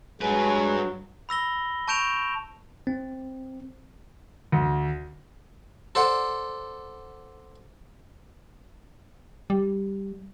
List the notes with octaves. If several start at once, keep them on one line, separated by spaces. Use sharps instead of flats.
G2 F#3 G#3 B4 G#5
B5 E6 A#6 G7
A5 C#6 G6 D7 E7 F7
C4
D2
A4 C5 D5 F#5
G3